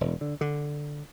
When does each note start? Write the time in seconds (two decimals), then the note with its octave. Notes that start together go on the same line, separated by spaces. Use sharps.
0.01 E1
0.21 D3
0.41 D3